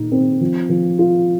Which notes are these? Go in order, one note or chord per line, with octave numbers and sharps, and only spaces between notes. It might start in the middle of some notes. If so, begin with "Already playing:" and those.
Already playing: A#2 D#4
C4
F3
F3
F4